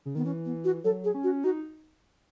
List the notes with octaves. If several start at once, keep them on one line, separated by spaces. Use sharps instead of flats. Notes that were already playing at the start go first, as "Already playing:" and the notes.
C#3
D#3 B3
E3 C#4
B3
F#4
F#3 A4
G#4
C#4
F#4
D#4 F#4